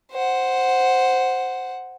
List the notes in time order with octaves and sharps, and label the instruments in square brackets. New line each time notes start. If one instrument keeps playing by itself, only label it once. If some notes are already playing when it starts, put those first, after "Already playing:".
[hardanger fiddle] C5 F#5